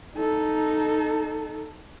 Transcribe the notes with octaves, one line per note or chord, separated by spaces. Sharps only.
D#4 A4